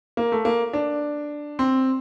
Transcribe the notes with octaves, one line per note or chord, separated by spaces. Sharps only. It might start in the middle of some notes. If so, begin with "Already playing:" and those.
A#3
A3
A#3
D4
C4